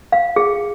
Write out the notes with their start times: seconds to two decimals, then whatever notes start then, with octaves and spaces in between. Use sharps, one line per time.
0.12 F5
0.36 G#4